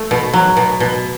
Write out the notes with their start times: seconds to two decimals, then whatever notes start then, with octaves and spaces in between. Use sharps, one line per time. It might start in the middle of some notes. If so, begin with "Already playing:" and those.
Already playing: A3
0.11 B2
0.33 F#3
0.57 B2
0.80 B2